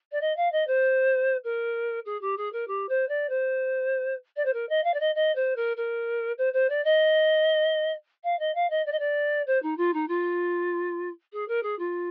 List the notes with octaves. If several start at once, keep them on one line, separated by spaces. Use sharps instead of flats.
D5
D#5
F5
D#5
C5
A#4
G#4
G4
G#4
A#4
G4
C5
D5
C5
D5
C5
A#4
D#5
F5
D5
D#5
D#5
C5
A#4
A#4
C5
C5
D5
D#5
F5
D#5
F5
D#5
D5
D#5
D5
C5
D#4
F4
D#4
F4
G#4
A#4
G#4
F4